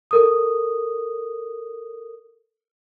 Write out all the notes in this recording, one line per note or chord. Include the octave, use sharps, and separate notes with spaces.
A4 A#4 D#6